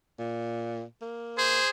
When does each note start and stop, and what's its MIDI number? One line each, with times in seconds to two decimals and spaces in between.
0.18 0.84 46
1.01 1.59 58
1.38 1.70 68
1.38 1.68 72